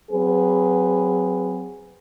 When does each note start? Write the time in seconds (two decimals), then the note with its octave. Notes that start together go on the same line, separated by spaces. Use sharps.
0.11 F#3 C4 G#4 B4